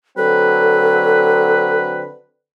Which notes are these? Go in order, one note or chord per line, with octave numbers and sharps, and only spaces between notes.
D3 F#3 C4 A4 B4